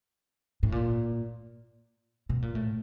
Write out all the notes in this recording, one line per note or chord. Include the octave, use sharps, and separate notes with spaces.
A2
A#2
B2
A#2
A2